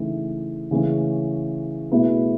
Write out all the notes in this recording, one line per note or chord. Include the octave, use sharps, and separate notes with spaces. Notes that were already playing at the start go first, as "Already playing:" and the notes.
Already playing: C#3 E3 A3 D#4
C#3 E3 A3 C#4
B2 A3 E4 G#4 B4